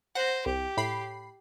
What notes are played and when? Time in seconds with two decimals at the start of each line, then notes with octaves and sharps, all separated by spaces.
0.15 C5 F#5 A#6
0.46 C2 G4
0.77 A2 B5 C7